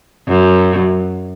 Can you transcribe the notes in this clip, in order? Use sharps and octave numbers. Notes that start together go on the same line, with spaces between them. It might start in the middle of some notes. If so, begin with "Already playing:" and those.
F#2